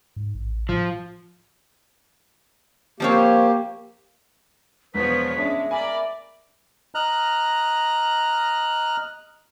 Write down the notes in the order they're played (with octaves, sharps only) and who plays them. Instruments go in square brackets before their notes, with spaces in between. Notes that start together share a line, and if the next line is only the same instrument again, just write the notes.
[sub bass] G#2
A1
[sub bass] A2 [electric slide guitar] F3
[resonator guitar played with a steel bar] F3 C4 C#5 [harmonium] A#3 G4
[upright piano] E1 [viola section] F3 B3 C#5 [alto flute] B4 [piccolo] B6
[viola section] G#3 [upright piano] C#4 D4 [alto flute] E5
[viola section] A#4 D5 [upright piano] G#5 [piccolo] B5
[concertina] D#5 A#5 F6 F#6